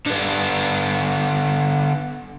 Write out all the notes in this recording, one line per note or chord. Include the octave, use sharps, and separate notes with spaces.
D3 B3